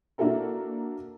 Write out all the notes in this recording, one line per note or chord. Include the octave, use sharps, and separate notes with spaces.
A#3 D4 E4 F#4 A4 A#4